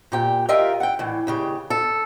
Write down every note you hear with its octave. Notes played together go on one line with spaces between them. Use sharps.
A#2 G4 G5
F4 G4 A#4 D#5 E5
F#5 G5
A2 E3
D#2 C#3 G4
A4